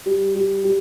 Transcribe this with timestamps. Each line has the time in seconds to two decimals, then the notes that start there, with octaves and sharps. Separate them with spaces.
0.06 G3
0.35 G3
0.64 G3